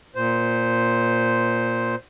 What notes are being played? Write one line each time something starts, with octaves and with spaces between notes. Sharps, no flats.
A#2 C5